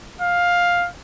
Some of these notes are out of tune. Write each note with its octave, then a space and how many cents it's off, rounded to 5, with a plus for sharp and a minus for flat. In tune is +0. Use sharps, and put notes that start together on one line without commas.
F5 +10